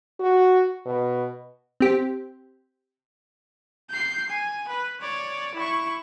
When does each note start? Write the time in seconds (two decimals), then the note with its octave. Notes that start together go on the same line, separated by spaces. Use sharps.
0.20 F#4
0.86 B2
1.80 C4 G4
3.90 G6 C7
4.30 G#5
4.69 B4
5.01 C#5 D5
5.55 E4 C#6